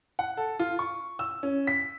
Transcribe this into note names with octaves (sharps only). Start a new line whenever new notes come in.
F#5
A4
F4
C#6
E6
C#4
B6